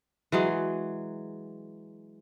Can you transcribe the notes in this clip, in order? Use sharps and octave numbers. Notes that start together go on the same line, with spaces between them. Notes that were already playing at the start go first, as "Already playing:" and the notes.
E3 F#3 G#3 G#4